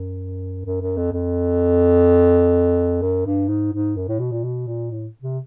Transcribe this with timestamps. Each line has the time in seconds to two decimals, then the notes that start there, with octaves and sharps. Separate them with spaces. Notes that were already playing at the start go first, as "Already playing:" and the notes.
Already playing: F#2
0.65 F#2
0.81 F#2
0.97 F2
1.13 F2
3.02 F#2
3.26 G2
3.48 G#2
3.73 G#2
3.96 F#2
4.08 A2
4.20 B2
4.32 A#2
4.44 B2
4.67 A#2
4.91 A2
5.22 C3